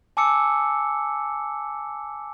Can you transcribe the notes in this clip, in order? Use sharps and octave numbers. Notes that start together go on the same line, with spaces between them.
G#5 A5 D6 E6 C#7